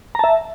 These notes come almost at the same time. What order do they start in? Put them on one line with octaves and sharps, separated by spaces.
A#5 A5 E5